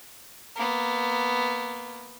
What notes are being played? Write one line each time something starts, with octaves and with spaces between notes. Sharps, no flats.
A#3 B3